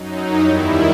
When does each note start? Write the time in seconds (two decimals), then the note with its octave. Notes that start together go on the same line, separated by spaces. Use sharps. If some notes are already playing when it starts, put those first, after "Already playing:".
Already playing: F#2 F#3 D#4
0.39 E2 D#3 G3 E4